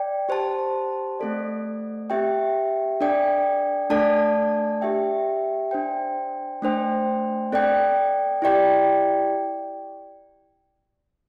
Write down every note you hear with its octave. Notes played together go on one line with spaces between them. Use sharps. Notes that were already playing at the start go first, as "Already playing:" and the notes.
Already playing: D5 G5
G4 C5 A5
A3 C4 A4 D5
C4 G4 E5 G5
D4 A4 D5 G5
A3 D4 A4 D5 A5
G4 E5 G5
D4 C5 G5
A3 D4 C5 G5
C4 A4 D5 G5
E4 G4 D5 G5